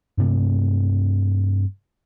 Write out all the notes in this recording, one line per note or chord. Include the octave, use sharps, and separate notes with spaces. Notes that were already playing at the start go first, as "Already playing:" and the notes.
G2 C3 A3